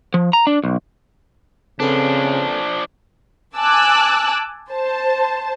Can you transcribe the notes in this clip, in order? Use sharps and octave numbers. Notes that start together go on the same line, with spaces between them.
F3
A#5
D4
B1
C#3 F3 C4 D4 A4 B4
G#5 A5 D6 E6 F#6
C5 A5